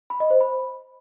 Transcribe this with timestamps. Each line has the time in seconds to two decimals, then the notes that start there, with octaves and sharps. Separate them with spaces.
0.10 B5
0.20 D#5
0.30 C5
0.41 B5